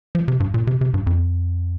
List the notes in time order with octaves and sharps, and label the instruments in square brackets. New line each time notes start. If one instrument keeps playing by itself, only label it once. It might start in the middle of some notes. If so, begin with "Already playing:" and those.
[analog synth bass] F3
C3
G2
A#2
C3
C3
G2
F2